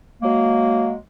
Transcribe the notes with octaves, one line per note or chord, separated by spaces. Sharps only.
F#3 G#3 A#3